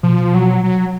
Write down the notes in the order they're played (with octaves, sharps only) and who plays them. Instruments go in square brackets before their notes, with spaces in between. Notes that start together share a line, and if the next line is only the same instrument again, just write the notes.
[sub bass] B2 [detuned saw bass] F3
[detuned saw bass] F#3
F#3